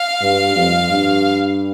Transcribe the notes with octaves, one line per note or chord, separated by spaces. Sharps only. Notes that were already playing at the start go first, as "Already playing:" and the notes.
Already playing: F5
G2
F2
G2